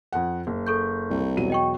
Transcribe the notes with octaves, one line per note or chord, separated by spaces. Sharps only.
F2 F#5
F#1
A4 C#6 G6
C2
E1 F#3 D#7
D#5 G5 C#6